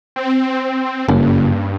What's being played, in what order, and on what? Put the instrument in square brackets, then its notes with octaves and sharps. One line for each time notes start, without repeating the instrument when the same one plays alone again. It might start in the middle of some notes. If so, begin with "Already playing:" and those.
[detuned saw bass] C4
[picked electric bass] F#1 [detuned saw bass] G2 [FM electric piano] A#3 C#4